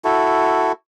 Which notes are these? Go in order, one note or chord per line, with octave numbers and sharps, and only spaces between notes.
E4 F#4 A4